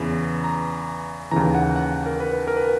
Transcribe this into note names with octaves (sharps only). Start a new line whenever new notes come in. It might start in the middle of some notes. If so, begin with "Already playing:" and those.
Already playing: E2 C#3 E3 B5
A#5
D#2 C#3 E3 A#5
F#5
F#5
A#4
B4
A#4
B4